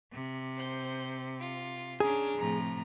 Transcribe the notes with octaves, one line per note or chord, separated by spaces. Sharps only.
C3
C5 G6
F4
C#4 D4 G#4 A#5
A2 C3 F3 A#5